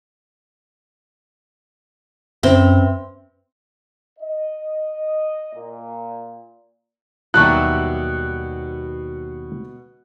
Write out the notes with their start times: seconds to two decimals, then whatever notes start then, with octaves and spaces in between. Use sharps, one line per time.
2.43 F#2 C4 C#4 B4 E5
4.19 D#5
5.54 A#2
7.34 D#2 B2 F#3 G3 E5 A5 C#6 F#6